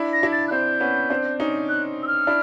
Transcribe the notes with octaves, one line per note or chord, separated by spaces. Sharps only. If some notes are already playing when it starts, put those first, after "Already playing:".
Already playing: D4 E4
A#6
D4 E4
A6
F#6
C4 D4 G6
B3 C#4
C4 D4
C#4 D#4
F#6
E6
F6
D4 E4